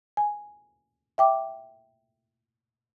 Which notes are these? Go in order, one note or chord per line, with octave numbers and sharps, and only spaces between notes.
G#5
E5 G5 D6